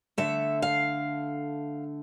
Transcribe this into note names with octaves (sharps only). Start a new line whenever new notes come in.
D3 A3 E5
F5